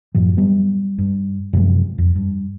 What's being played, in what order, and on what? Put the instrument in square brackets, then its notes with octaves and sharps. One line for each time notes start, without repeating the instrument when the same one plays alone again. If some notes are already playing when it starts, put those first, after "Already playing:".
[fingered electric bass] F#2 A2 F3
F#3 G3 B3
G2
F#2 C3 F3 G#3
F2
G2